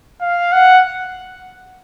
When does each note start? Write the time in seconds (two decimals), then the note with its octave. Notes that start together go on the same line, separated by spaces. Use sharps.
0.21 F5
0.52 F#5